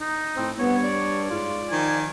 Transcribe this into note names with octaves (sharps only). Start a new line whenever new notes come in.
D#4
A2 C4
G2 B3 C#5
D5
G#2 F4
D#3 F3 G#5